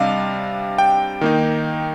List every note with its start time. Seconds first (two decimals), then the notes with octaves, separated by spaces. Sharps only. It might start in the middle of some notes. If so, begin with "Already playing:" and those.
Already playing: C3 G3 D4 D#5 F5
0.78 G5
1.21 D#3 A#3 D#4